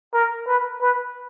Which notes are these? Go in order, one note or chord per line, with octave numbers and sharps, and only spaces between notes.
A#4
B4
B4